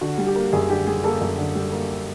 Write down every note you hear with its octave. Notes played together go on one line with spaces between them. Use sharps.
D3 F#4
G3
G4
A#3
F#2 G#4
D3 G4
G3 G#4
A#3 A4
F#2
D3
G3
A#3